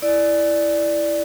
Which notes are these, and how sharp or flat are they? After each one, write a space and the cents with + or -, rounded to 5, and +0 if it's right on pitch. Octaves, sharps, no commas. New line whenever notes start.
E4 +0 D5 +0